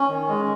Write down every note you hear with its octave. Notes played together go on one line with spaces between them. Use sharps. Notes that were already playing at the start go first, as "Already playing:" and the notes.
Already playing: C#4
D#3
G#3